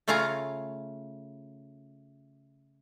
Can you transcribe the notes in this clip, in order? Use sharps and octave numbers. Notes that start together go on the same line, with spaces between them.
C#3 A3 F4 C#5 F5 A#5